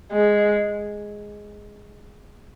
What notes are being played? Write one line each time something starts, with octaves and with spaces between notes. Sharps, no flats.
G#3